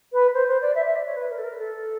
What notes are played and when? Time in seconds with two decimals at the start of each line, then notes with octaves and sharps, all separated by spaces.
0.12 B4
0.34 C5
0.48 C5
0.61 D5
0.75 E5
0.85 E5
0.95 D5
1.06 C#5
1.16 B4
1.30 A#4
1.38 A4
1.43 A#4
1.58 A4